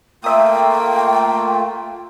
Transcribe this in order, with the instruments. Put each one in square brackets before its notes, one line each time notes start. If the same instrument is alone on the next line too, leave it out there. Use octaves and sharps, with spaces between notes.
[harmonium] A3 F4 [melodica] A#3 [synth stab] E5 D#6 [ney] G5